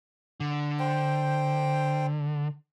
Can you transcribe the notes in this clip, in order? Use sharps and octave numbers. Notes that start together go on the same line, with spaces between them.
D3
C5 G5